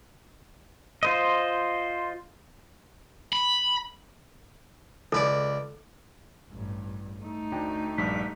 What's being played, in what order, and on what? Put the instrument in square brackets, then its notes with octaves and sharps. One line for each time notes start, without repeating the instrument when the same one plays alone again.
[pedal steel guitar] F4 C5 D#5
[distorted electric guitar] B5
[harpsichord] C#2 B4 D5 [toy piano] A4
[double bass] A1 G2
A3 D#4
[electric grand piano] D2 D4 G5
[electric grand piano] A#1 G2 G3 [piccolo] B6